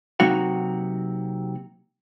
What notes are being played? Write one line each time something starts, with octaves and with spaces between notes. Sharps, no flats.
C3 F#3 A#3 D#4 F#4 F#5